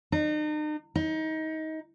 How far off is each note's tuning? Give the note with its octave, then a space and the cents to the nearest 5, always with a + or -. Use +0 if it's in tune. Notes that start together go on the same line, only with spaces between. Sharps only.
D#4 -40
D#4 +25